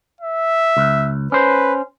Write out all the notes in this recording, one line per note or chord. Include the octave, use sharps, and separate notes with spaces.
E5
C#2
C#4 B4 C5